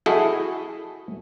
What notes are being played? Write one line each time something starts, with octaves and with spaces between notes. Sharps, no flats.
E4 F#4 G#4 A4 D#5